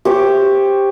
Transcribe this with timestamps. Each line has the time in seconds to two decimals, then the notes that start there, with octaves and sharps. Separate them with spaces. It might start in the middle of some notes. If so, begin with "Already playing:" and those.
0.05 G4 C5 C#5